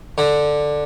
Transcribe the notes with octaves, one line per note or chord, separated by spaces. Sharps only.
D3